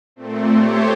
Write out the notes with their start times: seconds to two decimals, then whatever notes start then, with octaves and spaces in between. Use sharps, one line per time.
0.16 A#2 A3 C4
0.56 A3 G4 C5 C#5